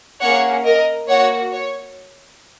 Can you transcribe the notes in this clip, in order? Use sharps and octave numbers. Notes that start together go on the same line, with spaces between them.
A#3 C#4 G#4 C#5 F#5
A#4 D#5
A#3 F#4 C#5 F#5
C#5